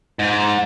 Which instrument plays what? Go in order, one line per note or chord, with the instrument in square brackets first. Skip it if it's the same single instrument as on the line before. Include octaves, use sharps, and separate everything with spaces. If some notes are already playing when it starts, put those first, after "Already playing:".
[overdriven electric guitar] G#2